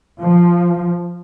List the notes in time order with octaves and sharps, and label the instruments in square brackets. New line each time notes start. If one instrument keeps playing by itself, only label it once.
[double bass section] F3